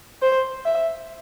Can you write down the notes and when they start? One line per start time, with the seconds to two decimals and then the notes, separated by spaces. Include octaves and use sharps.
0.22 C5
0.65 E5